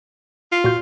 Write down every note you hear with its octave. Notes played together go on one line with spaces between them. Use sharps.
F4
A#2 F#4 G6